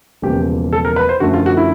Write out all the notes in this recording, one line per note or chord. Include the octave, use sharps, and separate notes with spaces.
E1 E2 C#3 F3 A#3 G4
A4
A#4
B4
C5
F#2 D3 F3 A3 F#4
F4
F#4
E4